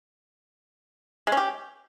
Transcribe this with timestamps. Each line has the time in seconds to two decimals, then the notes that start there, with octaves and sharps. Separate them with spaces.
1.27 G#3
1.32 C#4
1.37 G4